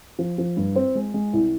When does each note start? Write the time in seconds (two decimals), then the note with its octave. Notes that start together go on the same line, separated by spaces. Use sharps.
0.19 F3
0.38 F3
0.57 G2
0.76 C4
0.95 G#3
1.14 G#3
1.33 C2